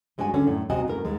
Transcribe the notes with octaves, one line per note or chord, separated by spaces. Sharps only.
G2 G#3 D4 F#4 G#5
D3 C#4
F#2 A2
D#2 C3 F#4 D#5 G#5
F#2 A2 A#4
D#2 G#2 G#3